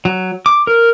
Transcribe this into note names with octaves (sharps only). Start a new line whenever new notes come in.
F#3
D6
A#4